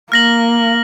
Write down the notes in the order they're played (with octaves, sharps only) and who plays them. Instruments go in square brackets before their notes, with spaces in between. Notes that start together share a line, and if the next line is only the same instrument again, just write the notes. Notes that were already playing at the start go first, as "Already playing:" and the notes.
[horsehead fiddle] A#3 [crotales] F6 A#6 F#7